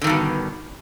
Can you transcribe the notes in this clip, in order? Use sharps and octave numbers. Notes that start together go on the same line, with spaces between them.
G2 B2 D3 D#3